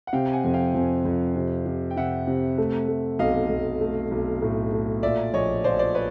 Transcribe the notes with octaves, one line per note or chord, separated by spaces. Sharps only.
F#5
C3 F5 G5
F#5 G#5
F2
F5 G5
F2
F2
C3
C3
G5
C3 E5 F#5
C3
A3
A3
B1 D#5 F5
B1
A3
B1
A2
A3
A#2 D5 E5
A#1 C#5 D#5
F3 C5 D5
C5 D5
B4 C#5